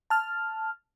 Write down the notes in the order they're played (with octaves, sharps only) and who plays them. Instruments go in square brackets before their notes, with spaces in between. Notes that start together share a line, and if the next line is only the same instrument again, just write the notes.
[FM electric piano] A5 F6